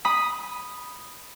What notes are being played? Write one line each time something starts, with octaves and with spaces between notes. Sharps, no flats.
B5 D#6